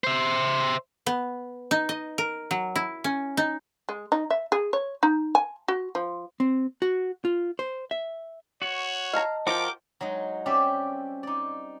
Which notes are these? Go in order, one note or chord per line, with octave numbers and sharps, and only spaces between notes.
C5 E5
B3
D#4
D#5
A#4
F#3
E4
C#4
D#4
G#3
D#4
E5
G#4
C#5
D#4
G#5
F#4
F3
C4
F#4
F4
C5
E5
F#4 C#5
D#5 F5 A5 A#5
F3 F#4 A#4 G5 D6
F#3 G#3 D#4
G3 C4 C#4 G4 D5 E5
D#4 D5